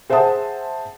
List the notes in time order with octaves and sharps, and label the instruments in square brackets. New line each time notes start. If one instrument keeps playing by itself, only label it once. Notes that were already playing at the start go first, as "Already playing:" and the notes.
[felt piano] G#4 C5 E5 F#5 A5 D#6